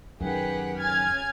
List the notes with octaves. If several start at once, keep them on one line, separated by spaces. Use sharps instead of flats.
F#2 D#3 G4 G#4 B4 F#5 G5
C#3 C#4 G#5 F6 G#6 A6